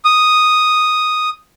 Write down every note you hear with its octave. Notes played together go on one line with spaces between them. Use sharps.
D#6